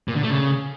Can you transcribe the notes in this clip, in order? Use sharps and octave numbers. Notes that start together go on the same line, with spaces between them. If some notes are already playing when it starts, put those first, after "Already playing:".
A#2
D3
A3
C#3